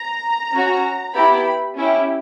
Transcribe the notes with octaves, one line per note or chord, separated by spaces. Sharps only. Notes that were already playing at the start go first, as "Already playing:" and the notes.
Already playing: A#5
C#4 F#4
B3 E4 G4 B5
C#4 E4 G4